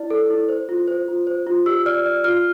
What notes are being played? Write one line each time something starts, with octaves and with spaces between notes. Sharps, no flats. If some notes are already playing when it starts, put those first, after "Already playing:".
Already playing: E4 D5
A4
E4
C5
F4
C5
F4
C5
F4
G4 E6
D5 F6
D5
F4 F6